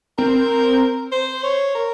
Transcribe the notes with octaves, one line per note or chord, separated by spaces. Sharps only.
C4 A#4
C5
C#5
A#4